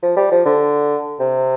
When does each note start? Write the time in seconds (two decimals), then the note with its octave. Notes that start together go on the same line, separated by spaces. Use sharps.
0.03 F3
0.16 G3
0.31 F3
0.45 D3
1.20 C3